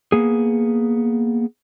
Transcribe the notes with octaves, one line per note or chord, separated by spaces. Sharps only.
A#3 B3 G#4